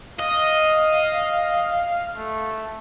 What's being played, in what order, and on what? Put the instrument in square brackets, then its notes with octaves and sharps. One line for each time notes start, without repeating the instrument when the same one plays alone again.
[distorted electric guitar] D#5 [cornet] F5
[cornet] A3